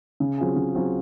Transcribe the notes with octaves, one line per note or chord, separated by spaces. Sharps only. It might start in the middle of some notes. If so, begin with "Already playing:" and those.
C#3
F#3 C4 F4 G#4
C#3
F#3 C4 F4 G#4